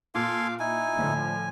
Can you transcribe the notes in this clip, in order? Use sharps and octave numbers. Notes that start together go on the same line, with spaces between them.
A#2 A4 F5 G#5 C6 D6
D#4 E4 G#5
A2 D3 F3